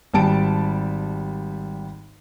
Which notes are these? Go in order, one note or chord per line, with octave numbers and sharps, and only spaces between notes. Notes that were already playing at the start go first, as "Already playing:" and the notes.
G#1 G3 A5 D7